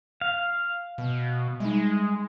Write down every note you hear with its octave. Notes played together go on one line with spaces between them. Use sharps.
F5
B2
G3 G#3 D#4